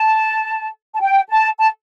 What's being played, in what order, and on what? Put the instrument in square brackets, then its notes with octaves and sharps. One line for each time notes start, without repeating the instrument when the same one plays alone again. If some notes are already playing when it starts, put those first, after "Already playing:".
Already playing: [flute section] A5
A5
G5
A5
A5